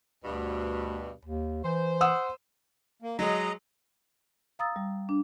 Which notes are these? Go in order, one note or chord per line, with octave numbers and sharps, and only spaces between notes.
D2 G2 B2
D#2
E3 C5
F#5 D#6 E6
A#3
F#3 G#3 D#5 A#5
F5 A#5 D#6 E6 A6
G3
D4